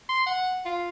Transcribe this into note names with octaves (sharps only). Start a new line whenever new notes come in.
C6
F#5
F4